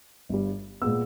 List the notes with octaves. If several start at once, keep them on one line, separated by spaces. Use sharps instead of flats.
G1 G2 G3
A#2 G#3 B3 E6